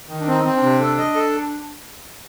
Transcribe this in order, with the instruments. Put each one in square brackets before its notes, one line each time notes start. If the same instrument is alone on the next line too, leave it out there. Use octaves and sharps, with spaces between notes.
[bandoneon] D#3
[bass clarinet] D4
[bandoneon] C4
[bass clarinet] D#4
[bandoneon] C4
[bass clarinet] D4
[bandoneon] C3
A4
D#5
A4